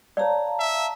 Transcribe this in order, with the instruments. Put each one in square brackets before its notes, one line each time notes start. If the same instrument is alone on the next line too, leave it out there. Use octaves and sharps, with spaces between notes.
[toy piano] C#5 D5 [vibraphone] F5 A5 A#5
[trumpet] E5